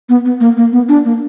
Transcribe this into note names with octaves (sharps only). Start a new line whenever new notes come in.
B3
B3
A#3
A#3
B3
D4
A#3